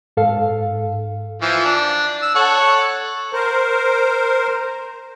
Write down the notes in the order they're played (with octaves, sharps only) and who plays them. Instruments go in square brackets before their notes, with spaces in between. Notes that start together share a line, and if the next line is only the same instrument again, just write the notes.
[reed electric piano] G#2 A4 F5
[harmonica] E3 F3
D4
E6
A4 C#5 F#5
[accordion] A#4 C5